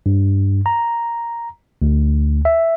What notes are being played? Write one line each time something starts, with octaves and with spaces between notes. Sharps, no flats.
G2
A#5
D2
E5